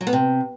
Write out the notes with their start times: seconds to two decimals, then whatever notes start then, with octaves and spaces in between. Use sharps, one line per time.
0.01 F#3
0.07 B3
0.13 C3